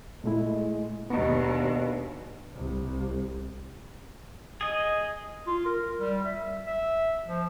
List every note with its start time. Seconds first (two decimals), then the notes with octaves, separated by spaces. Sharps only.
0.24 A#2 G#3 A3 E4
1.10 D#2 B2 D#3 G#3 B3 D4 D#5
2.55 C2
4.61 G#4 D#5
5.47 F4
5.65 A#4
6.00 G3
6.25 E5
6.67 E5
7.27 F3